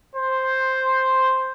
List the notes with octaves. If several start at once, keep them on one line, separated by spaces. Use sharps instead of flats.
C5